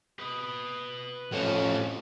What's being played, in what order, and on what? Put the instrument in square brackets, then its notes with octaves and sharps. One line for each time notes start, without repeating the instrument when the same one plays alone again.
[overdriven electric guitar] B4 D#5
[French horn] F2 [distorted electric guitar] A2 C#4